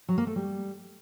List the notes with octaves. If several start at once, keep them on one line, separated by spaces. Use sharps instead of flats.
F#3
A#3
A3
G3